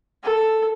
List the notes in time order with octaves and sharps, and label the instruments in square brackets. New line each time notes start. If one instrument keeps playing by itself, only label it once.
[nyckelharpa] A4